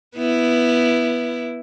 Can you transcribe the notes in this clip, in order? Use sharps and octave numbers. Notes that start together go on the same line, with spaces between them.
B3 E4